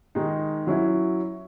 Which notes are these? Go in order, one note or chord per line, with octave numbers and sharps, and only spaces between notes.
D#3 G#3 D#4
F#3 C#4 E4